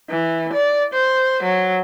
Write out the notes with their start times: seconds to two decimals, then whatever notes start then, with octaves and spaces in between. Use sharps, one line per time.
0.10 E3
0.53 D5
0.94 C5
1.43 F#3